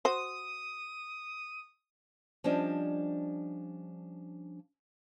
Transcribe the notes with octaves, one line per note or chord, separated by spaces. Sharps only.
F#4 C5 D#6
F3 G3 C#4 D4 D#5